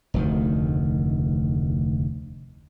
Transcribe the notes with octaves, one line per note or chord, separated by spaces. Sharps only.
F1 D2 D#3